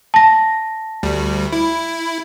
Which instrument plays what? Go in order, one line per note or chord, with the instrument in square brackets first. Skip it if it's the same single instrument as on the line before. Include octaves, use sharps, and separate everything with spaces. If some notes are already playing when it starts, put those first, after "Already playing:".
[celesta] A5 A#6
[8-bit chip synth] D2 G3
E4